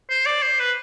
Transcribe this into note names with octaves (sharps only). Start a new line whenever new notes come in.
C5
D5
C5
B4